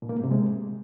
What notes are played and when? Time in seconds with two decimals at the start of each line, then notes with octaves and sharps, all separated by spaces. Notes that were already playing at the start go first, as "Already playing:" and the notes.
0.02 A#2
0.09 A#3
0.16 G#2
0.24 C3
0.31 G#3